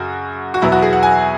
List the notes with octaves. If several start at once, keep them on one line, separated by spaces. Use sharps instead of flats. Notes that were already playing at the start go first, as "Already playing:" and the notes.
Already playing: F#2 C#3 F#4
F#4
E2 B2 F#3 B3 E4
F#4
G#4
F#5
G#5